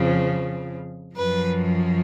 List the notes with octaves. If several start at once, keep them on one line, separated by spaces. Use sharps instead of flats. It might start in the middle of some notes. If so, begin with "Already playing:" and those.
Already playing: F2 C#3 F3
F#2 F3 B4